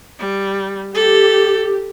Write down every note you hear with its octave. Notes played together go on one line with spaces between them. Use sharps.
G3
G4 A4